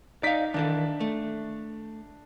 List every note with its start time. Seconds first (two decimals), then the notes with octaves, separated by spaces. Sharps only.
0.23 D#4 D5 F5 B6
0.54 D#3 E3 D4 A4
1.00 A3